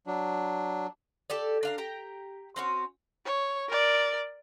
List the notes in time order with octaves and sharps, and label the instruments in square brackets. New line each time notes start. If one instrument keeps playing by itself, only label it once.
[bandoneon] F#3 D4
[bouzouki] G4 A4 D5
D4 F5 A#5
G4 G5 A#5
C4 C#4 F#4
[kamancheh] C#5
A#4 D5